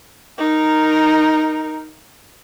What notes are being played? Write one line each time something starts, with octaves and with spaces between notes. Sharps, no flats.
D#4 A#4